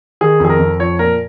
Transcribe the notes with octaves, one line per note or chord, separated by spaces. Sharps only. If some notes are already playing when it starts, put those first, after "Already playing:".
D#3 G#4
F2 G#4
A#4
F2
F3 C#5
A#2 A#4